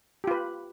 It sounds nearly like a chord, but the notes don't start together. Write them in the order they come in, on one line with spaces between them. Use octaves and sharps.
G4 F4 B4